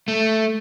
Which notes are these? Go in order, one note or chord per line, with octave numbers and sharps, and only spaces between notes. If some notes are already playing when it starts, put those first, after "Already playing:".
A3